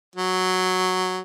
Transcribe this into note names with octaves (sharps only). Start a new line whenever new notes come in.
F#3